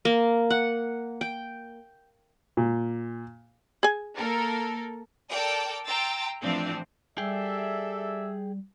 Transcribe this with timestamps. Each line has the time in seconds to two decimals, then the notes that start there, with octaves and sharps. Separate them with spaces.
0.05 A#3
0.50 F#5
1.21 G5
2.57 A#2
3.83 G#4 G#5
4.16 A#3 A4 A#4
5.30 A4 A#4 D5 G5
5.86 G5 A#5 C6 E6 A6
6.42 A2 E3 F3 C4 D4
7.18 G3 G#4 A4 D5 E5 G5